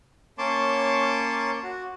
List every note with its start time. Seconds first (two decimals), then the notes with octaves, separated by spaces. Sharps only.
0.38 A#3 C#4 C#5 A5 C6 D6
1.63 F#4